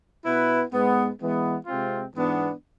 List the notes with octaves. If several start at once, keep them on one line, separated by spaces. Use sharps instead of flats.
B2 B3 E4 B4
G#2 G#3 B3
E3 G#3 B3
C3 G#3 C4 F4
G#2 E3 B3 D4